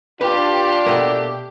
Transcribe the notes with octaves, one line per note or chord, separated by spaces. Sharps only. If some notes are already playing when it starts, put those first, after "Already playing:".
D4 F4 G4 B4
B2 A3 A#3